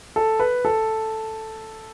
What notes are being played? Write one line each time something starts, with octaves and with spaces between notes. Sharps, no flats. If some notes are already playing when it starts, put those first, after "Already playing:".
A4
B4
A4